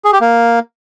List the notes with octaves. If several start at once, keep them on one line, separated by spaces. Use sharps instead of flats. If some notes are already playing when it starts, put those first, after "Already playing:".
G#4
G4
A#3